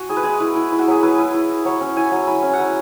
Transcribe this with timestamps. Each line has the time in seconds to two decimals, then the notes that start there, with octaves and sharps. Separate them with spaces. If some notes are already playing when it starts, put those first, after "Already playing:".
Already playing: F#4 G#5
0.09 E4 G#4
0.17 B4
0.23 G#3 G#4
0.40 E4
0.56 E4
0.72 E4
0.79 F#4
0.87 F#3 G#4
1.03 E4 B4
1.19 E4
1.34 E4
1.50 E4
1.65 F#3 C#5
1.81 C#4
1.96 E4 G#5
2.11 F#3
2.27 E4 B5
2.43 C#4
2.53 F#5
2.58 F#3 G#5